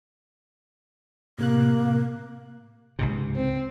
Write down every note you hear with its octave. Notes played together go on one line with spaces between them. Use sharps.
A2 C3 A#3 F#6
C#2 G#2 C3
C4